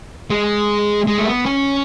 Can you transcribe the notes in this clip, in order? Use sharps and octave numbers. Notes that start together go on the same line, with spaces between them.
G#3
G#3
A3
B3
C#4